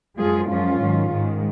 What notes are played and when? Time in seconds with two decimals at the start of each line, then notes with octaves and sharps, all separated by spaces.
0.18 F#2 F3 G#3 F4 G#4
0.49 F#2 F3 G#3 C#4 F4
0.80 G#2 D#3 F#3
1.11 G#2 D#3 G#3